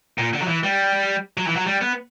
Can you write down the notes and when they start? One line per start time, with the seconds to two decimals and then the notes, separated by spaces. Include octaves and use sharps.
0.18 A#2
0.34 D3
0.42 F#3
0.48 E3
0.63 G3
1.37 F#3
1.47 E3
1.56 F#3
1.66 G3
1.81 B3